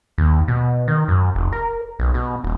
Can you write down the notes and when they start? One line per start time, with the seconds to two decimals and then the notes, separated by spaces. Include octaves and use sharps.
0.18 D#2
0.48 B2
0.88 D#3
1.08 F#2
1.35 F1
1.52 A#4
1.99 B1
2.14 B2
2.44 D#1